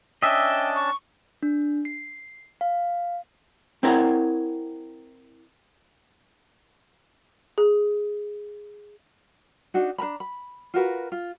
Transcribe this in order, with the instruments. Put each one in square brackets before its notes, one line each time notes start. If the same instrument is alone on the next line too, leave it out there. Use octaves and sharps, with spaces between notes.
[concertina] C#4 D4 A5 [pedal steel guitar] D#5 E5 [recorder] G5
[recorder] C#6
[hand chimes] D4
C7
F5
[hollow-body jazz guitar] C4 E4 A#4 C#5 F#5
[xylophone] G#4
[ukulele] D4 D#4 F#4
D4 B4 A#5 B5
B5
F4 F#4 A#4 B4
F4